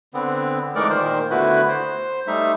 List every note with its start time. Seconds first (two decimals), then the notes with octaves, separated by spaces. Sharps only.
0.14 D3 B3 C4
0.75 E3 G#3 A3 D#4 A#4 D5
0.89 A#2 D#3 C5
1.30 D3 A3 B3 E4 F#4 B4
1.69 C5
2.27 G3 A3 D#4 E5